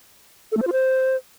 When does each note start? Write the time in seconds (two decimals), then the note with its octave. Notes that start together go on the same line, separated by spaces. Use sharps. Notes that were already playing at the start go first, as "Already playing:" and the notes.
0.52 A4
0.57 A3
0.62 C5
0.67 F4
0.72 C5